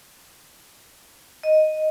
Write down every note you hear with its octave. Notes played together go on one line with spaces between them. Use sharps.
D#5